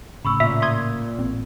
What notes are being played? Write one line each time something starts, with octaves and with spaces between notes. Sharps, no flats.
A2 C#3 B5 C#6 E6
A#2 E5
C6 D#6 G#6
A1 C4